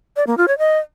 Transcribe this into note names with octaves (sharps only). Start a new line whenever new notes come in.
D5
A#3
F4
C#5
D#5